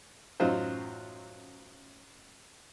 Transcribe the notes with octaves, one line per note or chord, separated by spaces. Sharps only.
A1 F#2 F#3 D#4 F4 C5